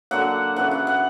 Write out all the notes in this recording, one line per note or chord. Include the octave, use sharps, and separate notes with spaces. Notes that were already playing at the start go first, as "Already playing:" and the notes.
D3 F#3 A#3 F#5
C#3 E3 B3 F#5
F#5
F#5